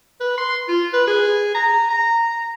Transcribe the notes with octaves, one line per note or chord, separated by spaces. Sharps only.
B4
C6
F4
B4
G#4
A#5
A#5